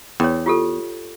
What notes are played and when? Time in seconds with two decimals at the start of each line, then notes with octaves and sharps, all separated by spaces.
0.20 E2 C#5 G5
0.46 F4 G4 A4